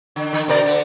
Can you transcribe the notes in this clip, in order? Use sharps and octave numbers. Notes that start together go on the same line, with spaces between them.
D3
D3
B2 A#4 D5
D3